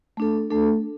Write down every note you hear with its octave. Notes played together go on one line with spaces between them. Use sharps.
A3 D4 A4
A3 D4 A4